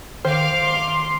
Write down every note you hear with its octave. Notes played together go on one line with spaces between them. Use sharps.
D#3 C5 F5 D6 F6
C6